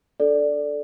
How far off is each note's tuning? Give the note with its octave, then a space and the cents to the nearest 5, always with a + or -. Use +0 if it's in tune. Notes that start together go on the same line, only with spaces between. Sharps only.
D4 +0 A4 +0 D5 +0